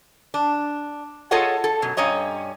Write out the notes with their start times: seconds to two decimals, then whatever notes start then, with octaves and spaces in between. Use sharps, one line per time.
0.34 D4
1.31 F4 G#4 A4 C#5 D#5 F#5
1.64 A4
1.82 F#2 B2
1.97 G2 C#4 C#5 D#5 A#5